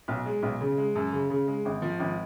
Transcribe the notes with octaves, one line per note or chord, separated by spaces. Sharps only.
B1
G#3
B1
C#3
G#3
F#2
C#3
C#3
G#3
G#1
F3
G#1